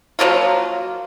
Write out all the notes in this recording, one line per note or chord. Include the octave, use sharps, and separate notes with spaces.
F3 F#3 A#3 F4